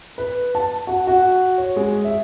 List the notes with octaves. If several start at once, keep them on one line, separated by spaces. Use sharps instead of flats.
B4
A5
F#4
F#4
C#5
G#3
E5